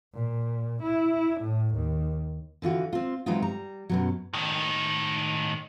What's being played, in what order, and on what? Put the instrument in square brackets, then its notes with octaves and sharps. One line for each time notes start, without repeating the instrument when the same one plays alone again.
[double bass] A#2
E4
A2
D#2
[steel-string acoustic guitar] D3 E3 F4 F#4
C4 F4
E3 F#3 G#3 C4 D#4 F4
G3 A#5
F#2 B2 F#3
[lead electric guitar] A2 D#3